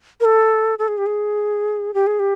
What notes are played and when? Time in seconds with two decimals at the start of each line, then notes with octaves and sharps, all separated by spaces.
0.20 A#4
0.25 A4
0.79 A4
0.88 G#4
0.98 G4
1.06 G#4
1.94 G4
2.07 G#4
2.20 G4